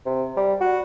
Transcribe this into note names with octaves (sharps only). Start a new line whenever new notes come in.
C3
G3
F#4